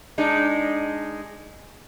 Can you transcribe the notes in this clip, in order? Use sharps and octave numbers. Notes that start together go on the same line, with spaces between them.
G#3 D4 D#4